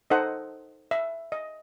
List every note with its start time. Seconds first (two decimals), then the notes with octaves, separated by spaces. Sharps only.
0.10 D#4 A4 C5 D#5 F#5
0.91 E5
1.32 D#5